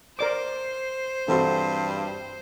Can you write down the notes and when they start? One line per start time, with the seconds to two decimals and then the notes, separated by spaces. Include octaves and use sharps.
0.19 A#4 C5 D5 D6
1.28 G2 E3 C4 F#4 A4